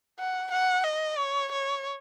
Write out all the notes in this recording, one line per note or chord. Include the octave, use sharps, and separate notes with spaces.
F#5
F#5
D#5
C#5
C#5